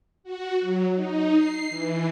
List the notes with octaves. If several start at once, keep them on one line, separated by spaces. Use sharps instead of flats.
F#4
F#3
D#4
C7
E3